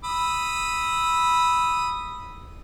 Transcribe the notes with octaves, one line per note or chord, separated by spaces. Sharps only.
B5 D#6 E6